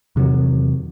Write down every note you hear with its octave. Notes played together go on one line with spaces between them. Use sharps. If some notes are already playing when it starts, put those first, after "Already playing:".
E2 C3 D#3 F#3